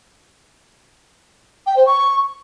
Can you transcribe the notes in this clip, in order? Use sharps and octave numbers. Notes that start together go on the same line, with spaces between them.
G5
C5
C#6